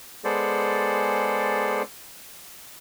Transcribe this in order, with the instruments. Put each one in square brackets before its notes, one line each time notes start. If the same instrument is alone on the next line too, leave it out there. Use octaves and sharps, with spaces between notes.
[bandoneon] G#3 B3 G#4 A4 C5 D5